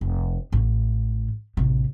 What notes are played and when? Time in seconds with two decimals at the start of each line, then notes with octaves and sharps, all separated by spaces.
0.01 F1
0.52 A1 A2
1.57 A1 C3